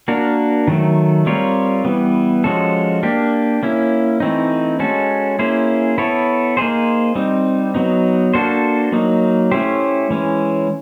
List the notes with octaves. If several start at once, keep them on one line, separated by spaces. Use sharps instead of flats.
A#3 D4 F#4 A#4
D#3 F#3 A3
G3 C4 F4 A#4 C#5
E3 G3 B3
F3 G#3 C#4 F#4 A4
A#3 D4 G4
A#3 C#4 E4
E3 A3 C4 D#4
G#3 C#4 F#4 A4
A#3 C#4 E4 G#4 C5
B3 E4 A4 C#5
A#3 D#4 G#4 C5
G3 C4 D#4
F#3 B3 D#4
A#3 D4 F#4 A4 C5
F#3 A#3 D#4
A3 C#4 E4 G4 C5
E3 G#3 C#4